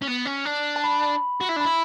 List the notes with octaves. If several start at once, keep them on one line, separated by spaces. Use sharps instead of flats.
C#4
B3
C#4
D4
A5
B5
F#4
E4
D4
E4 B5